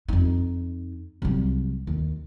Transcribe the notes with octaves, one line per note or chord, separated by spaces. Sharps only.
F2 D#4
C2 F#3
D#2